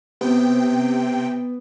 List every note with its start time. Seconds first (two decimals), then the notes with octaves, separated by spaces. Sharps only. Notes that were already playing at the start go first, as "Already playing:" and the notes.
0.21 C3 B3 G5